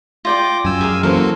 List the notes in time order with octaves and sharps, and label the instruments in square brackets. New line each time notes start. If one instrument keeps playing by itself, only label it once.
[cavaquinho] F4 D5 G5 [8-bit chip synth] D6 G6 A#6
[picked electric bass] F#2 [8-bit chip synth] G#5 E6
[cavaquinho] G#4 A#4 F5
[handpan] E3 C#4 C5 [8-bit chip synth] F#3 A#3 A4 [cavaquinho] A#4 F#5